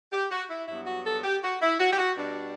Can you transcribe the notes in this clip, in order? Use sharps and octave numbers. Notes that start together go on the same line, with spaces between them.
G4
F#4
E4
G2 F#3 B3 E4
F#4
A4
G4
F#4
E4
F#4
G4
F#4
B2 G3 D4